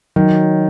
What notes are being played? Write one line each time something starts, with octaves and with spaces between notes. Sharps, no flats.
D#3 F#3